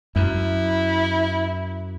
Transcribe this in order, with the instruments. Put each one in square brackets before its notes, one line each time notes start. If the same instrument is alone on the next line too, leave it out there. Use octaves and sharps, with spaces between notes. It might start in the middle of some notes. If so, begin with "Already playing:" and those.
[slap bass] F#2 [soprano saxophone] E4